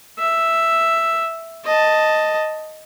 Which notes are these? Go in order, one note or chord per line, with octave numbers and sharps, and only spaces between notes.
E5
D#5 A5